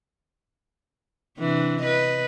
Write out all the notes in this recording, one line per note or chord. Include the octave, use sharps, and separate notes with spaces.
C3 E3 D4
B4 D#5